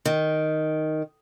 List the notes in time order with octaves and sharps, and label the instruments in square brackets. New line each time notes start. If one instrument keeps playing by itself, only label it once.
[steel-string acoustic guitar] D#3